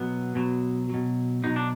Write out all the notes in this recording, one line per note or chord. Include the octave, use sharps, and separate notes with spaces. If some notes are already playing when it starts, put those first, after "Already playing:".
Already playing: B2 F#3 B3
B2 F#3
B2 F#3
B2 F#3 D#4
D4